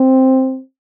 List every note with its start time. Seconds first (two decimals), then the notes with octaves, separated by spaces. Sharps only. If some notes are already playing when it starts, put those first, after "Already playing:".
Already playing: C4